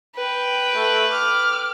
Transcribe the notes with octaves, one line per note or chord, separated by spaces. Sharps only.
B4 G5
A3 A4
D6 F6